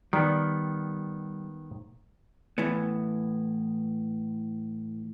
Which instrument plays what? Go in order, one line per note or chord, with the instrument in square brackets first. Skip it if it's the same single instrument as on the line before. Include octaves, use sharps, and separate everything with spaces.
[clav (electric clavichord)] D#3 B3 [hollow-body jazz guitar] G3
[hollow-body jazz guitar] A2 E3 B3